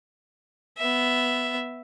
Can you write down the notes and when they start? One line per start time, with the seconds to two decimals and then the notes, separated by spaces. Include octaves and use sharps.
0.78 B3 E5